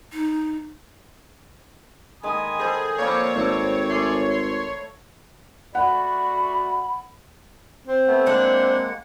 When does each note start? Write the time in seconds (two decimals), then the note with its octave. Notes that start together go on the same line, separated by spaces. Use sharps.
0.13 D#4
2.23 D#3 G#3 G#5 B5 D#6
2.59 G#4 A4 C5 D#5
2.98 F3 A#3 C4 C#5 D5 B5
3.35 G#1 A3 C4
3.90 A3 G#4 D5 C6
4.30 C6
5.75 A3 F#4 D5 F#5 B5
7.87 C4
8.07 A3 B3
8.26 G#3 A#3 D4 E4 F#5